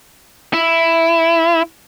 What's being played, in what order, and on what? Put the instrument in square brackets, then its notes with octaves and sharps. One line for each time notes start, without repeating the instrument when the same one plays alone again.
[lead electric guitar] E4